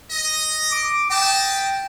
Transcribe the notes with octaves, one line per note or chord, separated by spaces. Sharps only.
D#5
D6
B4 D#5 G5 A5